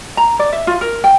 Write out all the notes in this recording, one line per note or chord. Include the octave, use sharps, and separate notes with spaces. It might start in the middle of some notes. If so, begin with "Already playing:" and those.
A#5
D5
E5
F4
A#4
G5